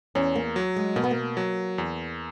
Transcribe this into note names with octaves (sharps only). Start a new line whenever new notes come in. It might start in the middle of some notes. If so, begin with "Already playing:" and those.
E2 C#4
A#3
F#3
G#3
B2 A#3
B3
A#3
F#3
E2